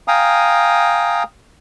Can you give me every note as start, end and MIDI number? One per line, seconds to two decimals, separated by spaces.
0.08 1.23 77
0.08 1.23 79
0.08 1.23 80
0.08 1.23 82
0.08 1.23 87